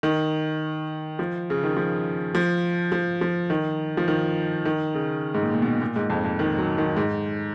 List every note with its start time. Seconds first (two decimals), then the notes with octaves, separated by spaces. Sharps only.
0.03 D#3
1.19 F3
1.50 C#3
1.63 D#3
1.77 F3
2.35 F3
2.92 F3
3.21 F3
3.50 D#3
3.97 F3
4.08 D#3
4.65 D#3
4.95 C#3
5.34 G#2
5.43 A#2
5.53 A#2
5.62 B2
5.82 A#2
5.96 G#2
6.10 F2
6.25 F2
6.39 D#3
6.58 F#3
6.78 D#3
6.97 G#2